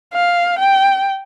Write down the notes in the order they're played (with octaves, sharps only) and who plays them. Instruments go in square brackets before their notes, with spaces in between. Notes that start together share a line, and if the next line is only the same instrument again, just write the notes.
[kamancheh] F5
G5